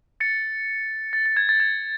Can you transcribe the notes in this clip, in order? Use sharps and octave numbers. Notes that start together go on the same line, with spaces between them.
A6 C#7
A6
A6
G#6
A6
G#6